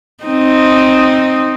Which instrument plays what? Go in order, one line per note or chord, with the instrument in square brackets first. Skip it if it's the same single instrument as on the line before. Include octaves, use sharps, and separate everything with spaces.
[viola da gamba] C4 D#4